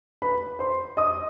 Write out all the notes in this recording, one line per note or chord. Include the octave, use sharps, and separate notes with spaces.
B4 B5
C5 C6
D#5 D#6